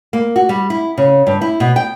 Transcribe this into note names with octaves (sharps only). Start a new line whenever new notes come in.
A#3
F#4
G3
E4
C#3
G2
E4
B2
G5